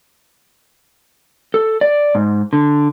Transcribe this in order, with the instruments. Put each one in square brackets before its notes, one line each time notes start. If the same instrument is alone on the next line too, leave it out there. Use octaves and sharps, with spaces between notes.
[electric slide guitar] A4
D5
G#2
D3